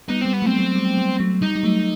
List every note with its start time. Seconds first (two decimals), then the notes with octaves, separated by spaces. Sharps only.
0.09 G3 B3 D#4
0.22 G3 C4
0.34 B3
0.42 F#3 A3 C4
0.59 F#3
0.75 G3
0.97 G3
1.20 F#3 A3
1.42 G3 D#4
1.56 G3
1.63 F#3 A3